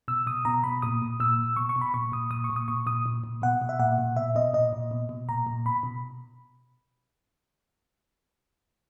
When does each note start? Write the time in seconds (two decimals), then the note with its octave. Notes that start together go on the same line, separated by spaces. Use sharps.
0.08 B2 E6
0.27 B2 D#6
0.45 B2 A#5
0.64 B2 B5
0.82 A#2 D#6
1.02 A#2
1.20 A#2 E6
1.38 A#2
1.56 B2 C#6
1.69 C#6
1.76 B2
1.81 B5
1.94 A#2 C#6
2.12 A#2 D#6
2.31 A#2 D#6
2.44 C#6
2.50 A#2
2.56 D#6
2.68 A#2 C#6
2.86 A#2 D#6
3.06 A#2
3.24 A#2
3.42 B2 F#5
3.62 B2
3.69 E5
3.79 A#2 F#5
3.98 A#2
4.16 B2 E5
4.35 B2 D#5
4.53 A#2 D#5
4.73 A#2
4.91 B2
5.09 B2
5.29 A#2 A#5
5.47 A#2
5.66 B2 B5
5.83 B2